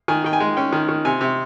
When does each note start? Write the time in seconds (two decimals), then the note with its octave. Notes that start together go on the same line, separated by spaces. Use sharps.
0.08 D#3 G#5
0.24 D#3 G5
0.33 G#5
0.40 G#3
0.57 C#4 G5
0.72 D#3
0.88 D#3
1.05 C3 G#5
1.21 C3